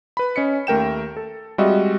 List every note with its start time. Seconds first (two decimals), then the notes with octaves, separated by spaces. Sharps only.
0.17 B4 B5
0.36 C#4 D#5 B6 C#7
0.67 D#2 A3 A#4 G5 E7
1.17 A4
1.58 G3 G#3 C4 F#4 D#5 E5